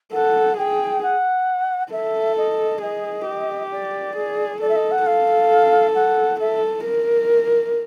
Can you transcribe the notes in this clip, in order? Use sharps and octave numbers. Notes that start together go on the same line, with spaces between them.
A4 F#5
G#4 G5
F#5
A4 E5
D#5
G#4 D#5
G4
D5
G#4
A4 D5
E5
D#5
F#5
A4 F5
F#5
A4 E5
A#4